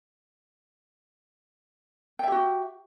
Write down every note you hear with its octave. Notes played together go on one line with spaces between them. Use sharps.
F#4 G4 E5 G5